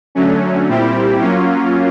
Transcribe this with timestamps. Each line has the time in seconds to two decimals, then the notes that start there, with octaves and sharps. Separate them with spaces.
0.15 D3 F#3 A3 C#4
0.68 A#2 G3 C4 E4 G4
1.20 F#3 A#3 C#4 F4